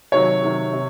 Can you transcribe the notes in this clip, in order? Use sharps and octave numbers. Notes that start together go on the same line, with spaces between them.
C3 D#3 F#3 C#5
C3 D#3 F#3
C3